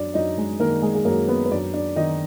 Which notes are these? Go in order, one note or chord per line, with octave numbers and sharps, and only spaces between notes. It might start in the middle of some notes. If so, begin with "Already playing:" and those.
Already playing: F#2 D4 D5
F#2 D#4 D#5
G#3 G#4
D#3 A#3 A#4
G#3 G#4
G#4
F#2 A#3 A#4
B3 B4
B4
F#2 D4 D5
D4 D5
D#3 D#4 D#5